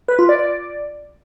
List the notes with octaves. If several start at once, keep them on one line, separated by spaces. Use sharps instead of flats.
B4
F4
D5
D5